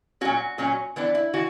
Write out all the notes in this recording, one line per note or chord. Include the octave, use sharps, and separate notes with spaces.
A#2 F#3 C#4 F#4
A#2 F#3 C#4
E3 B3 D4
E4
E3 F#4